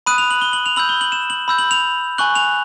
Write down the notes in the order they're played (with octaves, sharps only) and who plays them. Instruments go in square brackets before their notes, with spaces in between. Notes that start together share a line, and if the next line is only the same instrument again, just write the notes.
[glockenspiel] B5 D#6 F#6 D#7
F7
F#7
G7
F#7
F7
B5 E6 G6 F#7
G7
F#7
E7
F#7
B5 E6 G6
F#7
F7
G#5 C#6 F#6 F#7
F7